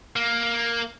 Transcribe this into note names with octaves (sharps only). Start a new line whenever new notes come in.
A#3